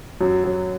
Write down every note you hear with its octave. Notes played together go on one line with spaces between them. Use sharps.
F#2 F#3
F#2 F#3